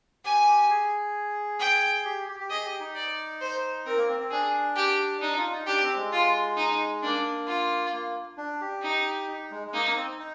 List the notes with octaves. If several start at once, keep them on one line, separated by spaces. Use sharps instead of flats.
G4 G#5
G4
G#4
G5
G4
G4
G4
G#4 D#5
G4
D#4
D5
C5
C4 A#4
A#3
C4
C4
D4 G#4
G4
D4 D#4
F4
D#4
D4 G4
C4
G#3
F4
D#4
A#3 D4
F4
A#3
D4
G4
D#4
D#4
G#3
G#3
A#3 D#4
A#3
C4
D#4